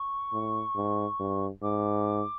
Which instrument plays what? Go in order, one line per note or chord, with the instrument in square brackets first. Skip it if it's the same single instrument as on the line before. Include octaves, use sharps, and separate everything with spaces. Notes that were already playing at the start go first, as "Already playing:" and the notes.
Already playing: [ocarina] C#6
[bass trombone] A2
G#2
G2
[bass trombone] G#2 [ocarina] D6